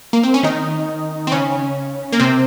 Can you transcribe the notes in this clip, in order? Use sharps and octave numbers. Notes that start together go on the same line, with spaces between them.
A#3
C4
C#4
D#3 D#4
C4
C#3 C#4
A#3
C3 C4